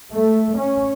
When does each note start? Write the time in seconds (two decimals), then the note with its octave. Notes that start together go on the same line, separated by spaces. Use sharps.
0.13 A3
0.57 C#4